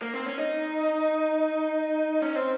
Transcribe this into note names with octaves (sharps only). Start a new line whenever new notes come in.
A#3
C4
C#4
D#4
C#4
C4